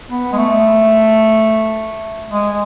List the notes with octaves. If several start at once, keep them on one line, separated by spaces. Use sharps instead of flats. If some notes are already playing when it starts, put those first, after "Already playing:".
B3
G#3
A3
G#3